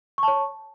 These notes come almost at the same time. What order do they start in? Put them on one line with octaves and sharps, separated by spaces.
C#6 A5 C#5